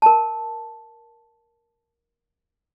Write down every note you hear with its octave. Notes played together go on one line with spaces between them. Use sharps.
A#4 A5